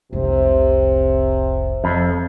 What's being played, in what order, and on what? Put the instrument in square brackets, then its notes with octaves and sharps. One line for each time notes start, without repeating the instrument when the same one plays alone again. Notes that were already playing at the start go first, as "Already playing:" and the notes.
[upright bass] F1 C2 [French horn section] C3
[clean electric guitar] F2